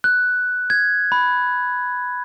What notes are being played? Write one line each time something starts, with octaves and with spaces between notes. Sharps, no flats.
F#6
G#6
B5